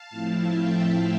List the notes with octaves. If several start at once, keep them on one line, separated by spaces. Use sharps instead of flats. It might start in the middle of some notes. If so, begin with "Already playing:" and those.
Already playing: F5 A5
A2 F3 A3 C4 E4
E5 G5